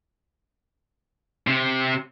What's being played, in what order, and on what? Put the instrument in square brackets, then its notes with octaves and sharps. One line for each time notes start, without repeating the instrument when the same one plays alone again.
[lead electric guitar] C3